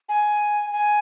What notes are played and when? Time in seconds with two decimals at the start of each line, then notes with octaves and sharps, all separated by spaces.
0.09 G#5
0.72 G#5